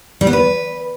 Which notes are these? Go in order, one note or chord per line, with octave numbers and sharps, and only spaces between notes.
G3
B3
B4